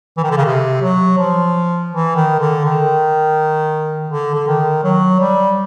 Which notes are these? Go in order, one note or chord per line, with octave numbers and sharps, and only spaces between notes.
E3
D#3
D3
C#3
C3
F#3
F3
E3
D#3
D3
D#3
D3
D3
D#3
F#3
G3